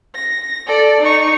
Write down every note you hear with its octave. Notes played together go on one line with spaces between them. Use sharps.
A#6
A4 D5
D#4 C#6